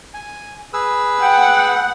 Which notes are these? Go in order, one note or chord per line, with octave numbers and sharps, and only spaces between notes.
G#5
G#4 B4 E6
F#5 G5